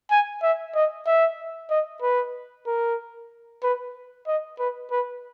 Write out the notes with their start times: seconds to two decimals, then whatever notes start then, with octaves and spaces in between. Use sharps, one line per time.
0.11 G#5
0.42 E5
0.75 D#5
1.06 E5
1.70 D#5
2.02 B4
2.67 A#4
3.63 B4
4.27 D#5
4.59 B4
4.91 B4